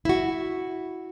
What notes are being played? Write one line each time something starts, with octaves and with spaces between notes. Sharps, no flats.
E4 F#4